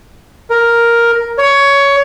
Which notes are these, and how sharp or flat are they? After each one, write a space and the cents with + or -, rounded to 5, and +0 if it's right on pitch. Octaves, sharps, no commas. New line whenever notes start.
A#4 +5
C#5 +15